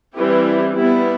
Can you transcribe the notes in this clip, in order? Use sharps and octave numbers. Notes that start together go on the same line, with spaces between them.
E3 G3 C4 E4 G4
G3 B3 E4